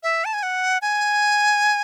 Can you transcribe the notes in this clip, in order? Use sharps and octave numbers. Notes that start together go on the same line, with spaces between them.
E5
A5
G#5
F#5
G#5